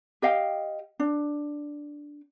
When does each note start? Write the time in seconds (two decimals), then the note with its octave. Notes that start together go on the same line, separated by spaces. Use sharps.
0.22 G4 D#5 F5 G5
0.99 D4